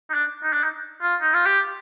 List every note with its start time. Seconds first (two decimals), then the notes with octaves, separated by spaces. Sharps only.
0.10 D#4
0.14 D4
0.44 D#4
0.53 D4
0.64 D#4
1.02 F4
1.21 D#4
1.34 F4
1.46 G4